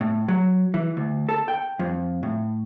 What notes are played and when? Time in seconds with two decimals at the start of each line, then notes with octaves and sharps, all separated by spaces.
0.01 A2
0.28 F#3
0.74 E3
0.97 D2
1.29 A4
1.48 G5
1.79 F2
2.23 A2